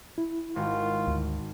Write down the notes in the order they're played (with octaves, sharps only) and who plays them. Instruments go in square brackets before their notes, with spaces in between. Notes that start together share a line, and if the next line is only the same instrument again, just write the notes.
[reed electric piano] E4
[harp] G#1 F#4 [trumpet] F4
[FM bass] D2